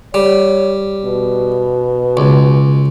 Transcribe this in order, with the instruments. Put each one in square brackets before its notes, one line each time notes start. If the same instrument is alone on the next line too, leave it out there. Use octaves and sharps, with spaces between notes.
[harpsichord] G3 [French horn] C#5
[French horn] B2
[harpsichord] C#2